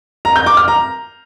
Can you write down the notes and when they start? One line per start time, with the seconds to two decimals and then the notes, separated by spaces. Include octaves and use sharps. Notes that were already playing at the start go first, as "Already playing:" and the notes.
0.25 A#5
0.36 G6
0.46 D6
0.57 F6
0.68 A#5